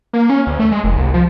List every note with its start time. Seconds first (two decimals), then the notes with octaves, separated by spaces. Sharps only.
0.13 A#3
0.30 C#4
0.47 D2
0.60 A3
0.72 G#3
0.84 F1
0.97 C2
1.14 F3